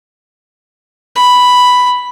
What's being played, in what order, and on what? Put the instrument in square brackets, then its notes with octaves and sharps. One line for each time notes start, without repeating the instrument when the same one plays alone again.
[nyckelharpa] B5